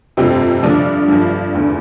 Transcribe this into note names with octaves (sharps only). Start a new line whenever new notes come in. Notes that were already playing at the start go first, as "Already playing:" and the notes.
G1 F2 C3 C4
G1 G2 D3 F3 D4
G1 G2 F3
F1 E2 D3